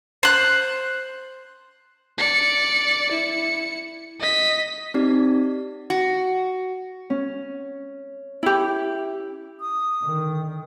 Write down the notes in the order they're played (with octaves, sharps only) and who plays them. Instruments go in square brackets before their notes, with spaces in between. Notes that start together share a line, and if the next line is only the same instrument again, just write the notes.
[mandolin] C5 F#6
[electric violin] D5 C#7
E4 C#7
D#5 B6
[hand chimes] C4 D#4 G4 D5
[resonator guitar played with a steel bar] F#4
[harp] C#4
[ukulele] E4 G4
[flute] D#6
[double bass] D3 D#3